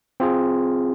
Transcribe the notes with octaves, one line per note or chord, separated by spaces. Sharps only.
C4 F4 G#4